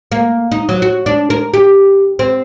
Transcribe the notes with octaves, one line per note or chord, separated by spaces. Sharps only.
A#3
D#4
F#3
F#4
D4
A#4
G4
C4